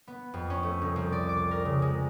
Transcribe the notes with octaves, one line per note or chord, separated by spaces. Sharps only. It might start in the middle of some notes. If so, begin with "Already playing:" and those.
B3
F2
C#4
A3
C2
C2
D5
D6
A#4
C#3
G#3